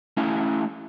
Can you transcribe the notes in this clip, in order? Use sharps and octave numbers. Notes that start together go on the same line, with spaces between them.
A3 C#4 E4 E5 F5